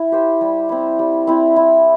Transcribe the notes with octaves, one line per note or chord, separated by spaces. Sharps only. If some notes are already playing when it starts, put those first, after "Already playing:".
Already playing: E4
G4 C5
G3
C4 E4
G3
C4 E4
E4